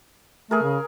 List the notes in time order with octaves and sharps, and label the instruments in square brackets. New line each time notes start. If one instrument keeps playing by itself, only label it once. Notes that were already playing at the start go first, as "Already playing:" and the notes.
[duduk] A3 [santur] G#4 A#4
[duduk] C#3